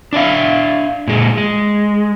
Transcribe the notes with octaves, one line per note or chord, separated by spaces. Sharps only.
D4 D5 E5 F5
A#2 G#3
G#3